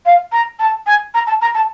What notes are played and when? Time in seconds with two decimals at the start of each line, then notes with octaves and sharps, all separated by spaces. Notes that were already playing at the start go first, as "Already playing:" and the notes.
0.05 F5
0.32 A#5
0.59 A5
0.86 G#5
1.14 A#5
1.27 A5
1.41 A#5
1.54 A5